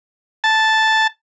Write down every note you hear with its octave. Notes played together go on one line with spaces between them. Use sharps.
A5